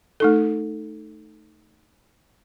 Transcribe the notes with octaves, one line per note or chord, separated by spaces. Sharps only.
A3 D#4 A4